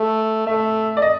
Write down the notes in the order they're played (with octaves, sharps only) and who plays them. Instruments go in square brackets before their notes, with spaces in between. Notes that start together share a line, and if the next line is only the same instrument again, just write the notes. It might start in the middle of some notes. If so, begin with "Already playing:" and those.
Already playing: [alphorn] A3
[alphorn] A3 [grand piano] E5
[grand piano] D5
D#5